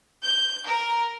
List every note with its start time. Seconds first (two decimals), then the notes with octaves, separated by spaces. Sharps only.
0.23 G6
0.66 A#4